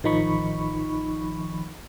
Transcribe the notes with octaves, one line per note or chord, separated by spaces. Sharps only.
A1 D#3 F3 D#4 B5 C#6